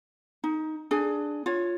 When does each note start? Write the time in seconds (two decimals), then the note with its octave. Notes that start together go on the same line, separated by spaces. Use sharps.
0.44 D#4
0.91 D4 G#4 G#5
1.46 F4 C#5